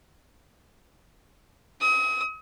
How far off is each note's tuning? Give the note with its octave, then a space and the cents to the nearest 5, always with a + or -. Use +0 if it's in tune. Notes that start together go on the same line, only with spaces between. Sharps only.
D#6 +40